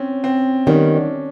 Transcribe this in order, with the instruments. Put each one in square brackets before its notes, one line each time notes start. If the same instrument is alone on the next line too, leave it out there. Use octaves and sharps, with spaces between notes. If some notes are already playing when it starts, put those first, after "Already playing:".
Already playing: [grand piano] C4 C#4
C4
[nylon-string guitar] D#3 G3 B3 [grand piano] C#4
[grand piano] D4